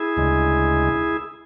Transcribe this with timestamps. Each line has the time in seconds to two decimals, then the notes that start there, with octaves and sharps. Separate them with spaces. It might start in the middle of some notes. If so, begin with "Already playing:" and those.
Already playing: E4 G#4
0.17 D2 C#3 G#3